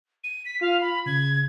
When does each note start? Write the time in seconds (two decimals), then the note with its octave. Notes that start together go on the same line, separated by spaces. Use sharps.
0.23 D#7
0.45 B6
0.61 F4 F5
0.80 B5
1.06 C#3 G#6